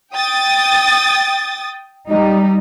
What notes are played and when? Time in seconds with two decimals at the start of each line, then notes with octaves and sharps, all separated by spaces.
0.15 G5 D#6 A6
2.08 G3 D#4